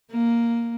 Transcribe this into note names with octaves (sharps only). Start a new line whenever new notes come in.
A#3